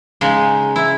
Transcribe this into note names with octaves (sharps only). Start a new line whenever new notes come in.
C#3 G#3 D#4
E4